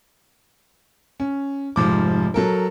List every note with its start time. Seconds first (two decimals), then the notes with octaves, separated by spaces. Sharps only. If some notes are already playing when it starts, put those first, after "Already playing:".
1.20 C#4
1.76 F1 G#2 F3 D6
2.34 F#3 A4 A#4